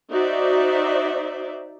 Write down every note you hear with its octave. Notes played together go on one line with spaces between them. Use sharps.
D#4 F#4 C5 D5 E5